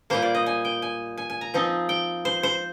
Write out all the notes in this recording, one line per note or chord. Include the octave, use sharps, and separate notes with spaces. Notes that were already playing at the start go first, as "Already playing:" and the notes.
A#2 G3 A#3 C5
D5
D#5
G#5
G5
G#5
G#5
G#5
A#5
F3 C4 D#4
G5
C5
C5